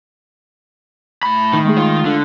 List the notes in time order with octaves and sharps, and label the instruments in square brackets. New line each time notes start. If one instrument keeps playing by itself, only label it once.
[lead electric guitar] A2 B5
[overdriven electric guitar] D#3
[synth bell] G#3 A3 G#4
[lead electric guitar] F4 F5
[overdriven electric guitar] D3